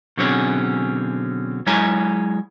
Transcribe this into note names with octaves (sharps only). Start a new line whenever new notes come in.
B2 D3 F#3 C4 C#4 G#4
F#3 G#3 E4 C#5 G#5 A#5